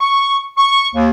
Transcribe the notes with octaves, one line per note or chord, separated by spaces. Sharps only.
C#6
C#6
D#2